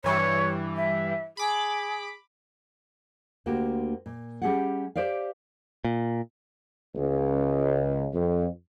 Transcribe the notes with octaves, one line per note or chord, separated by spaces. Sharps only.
G2 E3 G3 C#5
E5
G#4 B5 D6
D2 D3 A#3 F#4 G4
A#2
G3 C#4 G4 G#4 E5 F#5
G4 C5 D5 E5 F5
A#2
C#2
F2